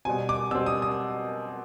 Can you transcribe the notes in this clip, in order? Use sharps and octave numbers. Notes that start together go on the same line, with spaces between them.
B2 G3 C4 G#5
D6
B2 G3 C4 E6
D#6
D#6